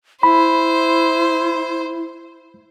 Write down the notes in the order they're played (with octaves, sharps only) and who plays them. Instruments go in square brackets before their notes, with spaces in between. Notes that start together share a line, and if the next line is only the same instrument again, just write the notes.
[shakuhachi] E4 [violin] C5 [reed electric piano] B5